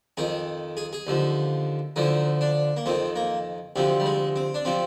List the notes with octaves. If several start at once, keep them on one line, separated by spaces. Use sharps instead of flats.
F2 D#3 G#4
G#4
G#4
D#2 D3 F3
D2 D3 F3 D#4
D4
A#3
F2 D#3 C4
A#3
D2 C3 F3 C4
G3
G#3
C4
D4
C3 F3 C4